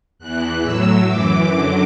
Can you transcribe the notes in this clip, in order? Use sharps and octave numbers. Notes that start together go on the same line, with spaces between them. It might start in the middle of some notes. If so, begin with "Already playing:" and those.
E2 E3 F#6
A2 F#3 E6
F#2 E3 D6
F#2 D3 F#3